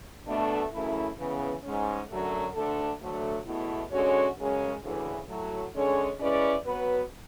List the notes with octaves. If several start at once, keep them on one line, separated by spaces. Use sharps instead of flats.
B2 A3 D4
F#2 C#3 E3 A3 E4
C#3 E3 B3
G#2 G#3 C#4
F#2 D3 F#3 A3
D2 D3 A3 D4 A4
D2 D3 F#3 A3
E2 B2 A3 E4
D3 G#3 C#4 F#4 C#5
F#2 C#3 G#3 C#4
D2 C#3 E3
A2 F#3 A3
D3 G#3 C#4 G#4 C#5
G#3 C#4 E4 B4 D5
F#3 B3 F#4 B4